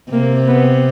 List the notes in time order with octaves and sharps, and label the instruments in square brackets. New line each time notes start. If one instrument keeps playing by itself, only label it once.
[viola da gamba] C3 [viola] A#3
[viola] B3